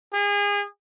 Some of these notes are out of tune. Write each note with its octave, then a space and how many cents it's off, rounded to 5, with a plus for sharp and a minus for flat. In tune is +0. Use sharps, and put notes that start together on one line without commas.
G#4 -30